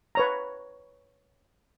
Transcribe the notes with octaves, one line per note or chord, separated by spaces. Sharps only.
B4 C#5 A#5